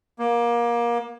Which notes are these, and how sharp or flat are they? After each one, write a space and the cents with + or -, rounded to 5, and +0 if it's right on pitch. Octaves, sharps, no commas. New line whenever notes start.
A#3 +25